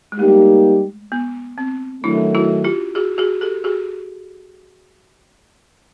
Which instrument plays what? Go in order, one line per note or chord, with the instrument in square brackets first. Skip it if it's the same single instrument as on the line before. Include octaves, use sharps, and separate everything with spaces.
[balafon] G#3
[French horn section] G3 A#3 D#4 G4 [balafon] A3
[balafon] B3
C4
[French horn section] D#3 F#3 A3 [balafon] D4 E4
[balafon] E4 F#4
F4 G4
F#4 G#4
F#4 G#4
G4 A4
F#4 G#4